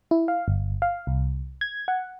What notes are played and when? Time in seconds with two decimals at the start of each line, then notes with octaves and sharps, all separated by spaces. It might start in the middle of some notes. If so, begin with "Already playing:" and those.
0.11 E4
0.28 F5
0.48 G1
0.82 F5
1.07 C2
1.61 G#6
1.88 F#5